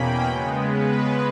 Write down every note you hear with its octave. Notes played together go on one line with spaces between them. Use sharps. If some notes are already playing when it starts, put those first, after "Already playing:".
Already playing: E2 B2 A#3 C#4 G5 B5
C#3 G#3 B3
B4